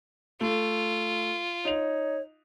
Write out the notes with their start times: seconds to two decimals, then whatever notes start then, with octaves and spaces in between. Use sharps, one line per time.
0.41 A3 F4
1.65 D#4 C#5 F7